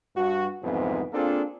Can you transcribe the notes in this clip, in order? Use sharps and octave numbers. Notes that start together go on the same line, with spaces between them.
G2 F#4
C2 F2 G#2 E3 B3
A#3 C4 D4 F4 G#4 A4